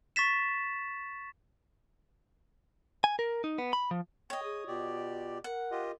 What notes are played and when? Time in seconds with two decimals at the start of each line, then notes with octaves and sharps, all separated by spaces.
0.16 C#6 A6 B6 E7
3.04 G#5
3.19 A#4
3.44 D#4
3.58 B3
3.73 B5
3.91 F3
4.30 C#5 D#5 G5
4.44 G#4 D#6
4.67 B2 F4 G4 D5
5.44 A#4 F#5
5.72 F4 G4 D#5